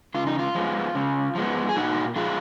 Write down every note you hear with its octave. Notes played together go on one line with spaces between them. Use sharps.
C#3 F4
D#4
F4
F3 G#3 B3
C#3
F3 G#3 B3
G#4
A#2 D#4 F#4
F3 G#3 F4 G#4